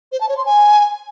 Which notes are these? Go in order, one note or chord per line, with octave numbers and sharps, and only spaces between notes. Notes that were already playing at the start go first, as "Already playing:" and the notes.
C5
A5
C#5
C6
G#5